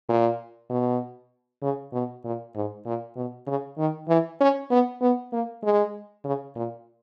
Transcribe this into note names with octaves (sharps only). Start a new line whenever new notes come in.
A#2
B2
C#3
B2
A#2
G#2
A#2
B2
C#3
D#3
E3
C#4
B3
B3
A#3
G#3
C#3
A#2